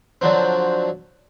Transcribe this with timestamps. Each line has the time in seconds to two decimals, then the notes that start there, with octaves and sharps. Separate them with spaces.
0.21 D3 F3 F#3 C4